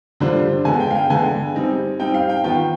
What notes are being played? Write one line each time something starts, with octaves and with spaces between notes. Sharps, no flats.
D3 G3 D4 F4 C5
D3 G#3 B3 G#5
G5
F5
G5
D3 G#3 B3 G#5
G3 C4 D#4
G3 C4 D#4 G5
F5
G5
D#3 B3 F4 G5